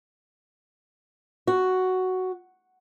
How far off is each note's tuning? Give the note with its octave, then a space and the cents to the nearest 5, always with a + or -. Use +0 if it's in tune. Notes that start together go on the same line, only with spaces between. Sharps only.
F#4 +5